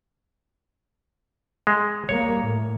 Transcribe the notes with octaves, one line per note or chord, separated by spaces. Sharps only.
G#3
G3 A#3 C#5
A2